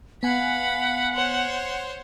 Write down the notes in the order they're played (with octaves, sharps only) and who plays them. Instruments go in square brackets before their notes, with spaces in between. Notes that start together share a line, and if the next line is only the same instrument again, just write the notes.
[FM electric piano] B3 G#5 [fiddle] F5 B5 [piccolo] F#5
[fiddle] C5 C#5